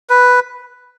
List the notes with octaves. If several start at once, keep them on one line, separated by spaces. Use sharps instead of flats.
B4